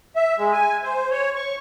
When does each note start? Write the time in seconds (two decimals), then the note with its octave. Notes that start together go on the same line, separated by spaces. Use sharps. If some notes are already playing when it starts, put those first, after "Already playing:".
0.16 E5
0.38 G#3
0.52 G#5
0.83 C5
1.11 C#5
1.35 C#6